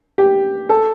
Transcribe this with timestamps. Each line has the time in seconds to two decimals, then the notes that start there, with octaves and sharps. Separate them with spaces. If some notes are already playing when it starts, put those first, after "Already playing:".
0.18 G4
0.69 A4